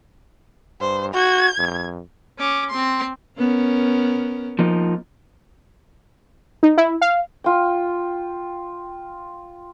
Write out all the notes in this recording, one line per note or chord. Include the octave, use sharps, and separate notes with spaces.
G2 C5
F#4 G#6
F2
C#4 D6
C4 C6
B3 C#4 A#4
F3 A#3 D#4
D#4
E4
F5
F4 G5